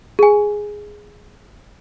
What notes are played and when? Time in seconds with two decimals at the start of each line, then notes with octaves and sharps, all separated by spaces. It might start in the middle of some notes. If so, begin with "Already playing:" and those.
0.19 G#4 G#5